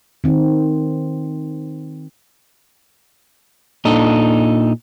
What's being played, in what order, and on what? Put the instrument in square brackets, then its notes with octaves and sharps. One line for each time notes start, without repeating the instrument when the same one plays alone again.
[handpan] D#3 C4
[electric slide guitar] A#2 D4 D#4 A4